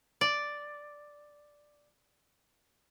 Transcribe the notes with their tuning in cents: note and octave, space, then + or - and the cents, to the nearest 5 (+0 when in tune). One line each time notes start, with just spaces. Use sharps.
D5 +0